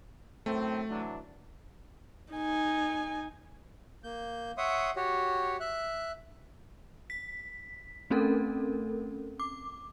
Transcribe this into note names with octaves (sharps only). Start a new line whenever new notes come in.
F#2 A2 A3 C4
E3 F#3 D4
D#4 G#5
A#3 G6
C#5 E5 F#5 C6 D#6
F#4 G4 C#5
E5 F#6
B6
A3 C4 C#4 A4 A#4
D6